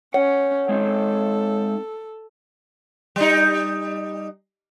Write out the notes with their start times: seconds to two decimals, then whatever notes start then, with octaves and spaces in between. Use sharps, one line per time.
0.14 C#4 C#5 F#5
0.69 G#3 C4 D#4 A4
3.16 G3 D#4